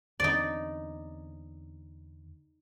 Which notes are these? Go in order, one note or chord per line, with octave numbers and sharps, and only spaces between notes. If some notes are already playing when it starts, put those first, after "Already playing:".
E2 D3 C4 D#4 D5